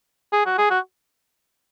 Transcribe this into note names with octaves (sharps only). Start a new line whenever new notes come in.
G#4
F#4
G#4
F#4